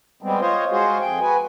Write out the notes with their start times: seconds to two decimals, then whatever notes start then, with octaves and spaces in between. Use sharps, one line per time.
0.22 G3 G#3 B3 C4
0.40 F4 C5 C#5 D#5
0.71 G#3 F4 F#4 G#4 C5
1.00 F2 G#4 G5
1.20 F#4 B4 G#5